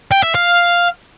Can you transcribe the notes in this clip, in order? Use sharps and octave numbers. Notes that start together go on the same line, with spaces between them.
G5
E5
F5